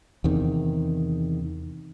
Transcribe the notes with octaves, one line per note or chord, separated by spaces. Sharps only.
E2 C3 D#3